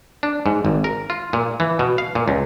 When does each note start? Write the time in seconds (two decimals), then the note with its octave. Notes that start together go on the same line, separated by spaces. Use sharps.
0.23 D4
0.46 G#2
0.65 G#1
0.84 A#4
1.10 F4
1.33 A#2
1.60 E3
1.79 B2
1.98 F5
2.15 A#2
2.28 C#2